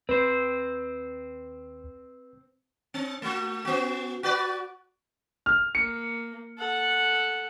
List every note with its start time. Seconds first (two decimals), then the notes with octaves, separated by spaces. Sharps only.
0.09 D#2 C4 B4 C5
2.94 C4
3.22 A3 F#4
3.65 B3 F#4
4.23 F#4 B4 D5
5.46 F6
5.75 A#3 C#7
6.58 A4 F#5